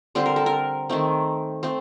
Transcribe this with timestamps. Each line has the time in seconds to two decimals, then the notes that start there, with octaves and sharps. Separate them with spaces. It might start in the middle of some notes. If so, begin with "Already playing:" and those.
0.15 D3 G3 C4 C5
0.26 A#4
0.36 A4
0.46 A#4
0.89 D#3 A3 C4
1.63 A3 C4